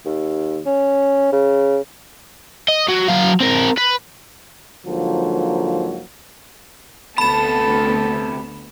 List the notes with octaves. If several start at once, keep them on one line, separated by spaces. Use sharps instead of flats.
D#2
C#4
C#3
D#5
F#3
F#3 F5
C4 A#4
B4
G#2 D3 F3 F#3 A#3
D2 C3 B3 A4 A5 B5 E7